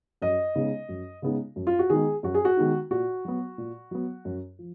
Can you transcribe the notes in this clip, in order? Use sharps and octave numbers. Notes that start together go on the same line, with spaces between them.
F#2 D#5
C#3 G#3 B3 D#4
F#2
C#3 G#3 B3 D#4
F#2
F4
F#4
D#3 G#3 B3 D#4 G#4
F#2 F#4
G#4
F#4
D#3 G#3 B3 D#4
A#2 F#4
F#3 B3
A#2
F#3 B3
F#2
F3